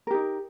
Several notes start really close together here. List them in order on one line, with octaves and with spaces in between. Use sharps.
A#4 G4 D#4